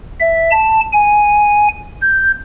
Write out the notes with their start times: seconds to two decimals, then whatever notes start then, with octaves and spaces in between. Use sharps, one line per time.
0.20 E5
0.51 A5
0.93 G#5
2.01 G6